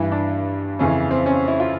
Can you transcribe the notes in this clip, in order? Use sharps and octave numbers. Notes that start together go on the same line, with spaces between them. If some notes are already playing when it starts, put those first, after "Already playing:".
Already playing: G2 E3
D4
F2 C#3 E3 C#4
C4
C#4
E4
F4